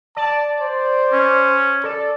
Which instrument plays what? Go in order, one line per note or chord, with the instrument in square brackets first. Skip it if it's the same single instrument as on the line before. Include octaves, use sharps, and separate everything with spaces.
[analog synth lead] D5 [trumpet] A5
[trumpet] C5
[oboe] C#4
[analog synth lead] A4 [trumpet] D5